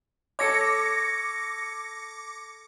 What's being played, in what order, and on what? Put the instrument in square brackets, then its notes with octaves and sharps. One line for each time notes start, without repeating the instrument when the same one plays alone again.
[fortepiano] A4 C#5 [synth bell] D6 A#6 C#7